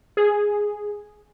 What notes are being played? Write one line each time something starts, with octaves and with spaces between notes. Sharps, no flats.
G#4